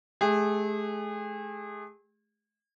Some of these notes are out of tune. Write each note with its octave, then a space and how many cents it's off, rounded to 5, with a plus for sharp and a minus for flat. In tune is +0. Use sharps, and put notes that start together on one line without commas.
A3 -45 G#4 -35